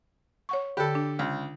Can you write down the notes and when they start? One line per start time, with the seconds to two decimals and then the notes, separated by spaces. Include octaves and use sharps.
0.49 C#5 F#5 C#6
0.77 D3 G4 A4 B5
0.95 D4
1.19 C#2